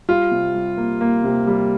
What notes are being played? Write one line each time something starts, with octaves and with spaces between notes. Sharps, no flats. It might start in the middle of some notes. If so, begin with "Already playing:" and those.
G3 F4
C3
G3
A#3
A#3
C3
G3